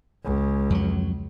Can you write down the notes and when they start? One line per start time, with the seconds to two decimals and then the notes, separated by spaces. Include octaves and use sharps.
0.24 C#2
0.70 F2 F#3